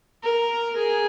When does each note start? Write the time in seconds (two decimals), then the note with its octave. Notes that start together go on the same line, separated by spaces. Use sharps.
0.23 A#4
0.76 G#4